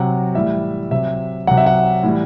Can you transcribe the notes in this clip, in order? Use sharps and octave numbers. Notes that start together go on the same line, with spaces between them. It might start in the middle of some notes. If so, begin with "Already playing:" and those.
Already playing: C3 F#3 F#5
A2 E3 G3 E5
C3 F#3 E5
C3 F#3 F#5
E5
F#5
A2 E3 G3